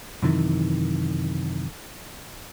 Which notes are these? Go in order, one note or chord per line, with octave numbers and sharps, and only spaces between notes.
F#2 C3 D#3 E3